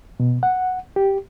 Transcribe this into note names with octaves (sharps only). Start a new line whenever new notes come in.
B2
F#5
G4